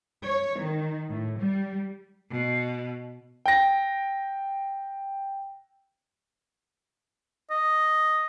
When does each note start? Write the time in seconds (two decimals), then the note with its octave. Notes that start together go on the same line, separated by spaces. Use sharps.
0.25 C#5
0.60 D#3
1.09 A2
1.37 G3
2.31 B2
3.46 G5 A#6
7.50 D#5